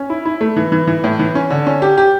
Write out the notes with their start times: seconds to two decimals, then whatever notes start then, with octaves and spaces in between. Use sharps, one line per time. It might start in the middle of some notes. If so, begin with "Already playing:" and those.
Already playing: C#4
0.10 E4
0.25 E4
0.41 A3
0.57 E3
0.72 E3
0.87 E3
1.04 A2
1.19 E3
1.35 C#4
1.50 D3
1.67 C#4
1.82 G4
1.97 G4